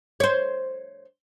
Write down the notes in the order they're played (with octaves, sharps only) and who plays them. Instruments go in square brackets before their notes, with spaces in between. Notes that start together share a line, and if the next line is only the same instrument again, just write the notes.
[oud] C5 C#5